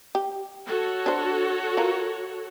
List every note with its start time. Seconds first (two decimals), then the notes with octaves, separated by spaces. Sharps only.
0.15 G4
0.66 F#4 A4 C#5
1.06 D4 C5
1.77 F4 A#4